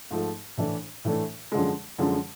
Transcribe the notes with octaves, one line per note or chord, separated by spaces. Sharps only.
G#2 F3 A3
A2 E3 A3 D4
A2 E3 A3 D4
F#2 D3 F3 G#3
F#2 D3 F3 G#3